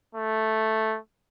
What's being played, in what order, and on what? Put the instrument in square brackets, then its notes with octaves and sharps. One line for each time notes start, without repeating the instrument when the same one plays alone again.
[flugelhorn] A3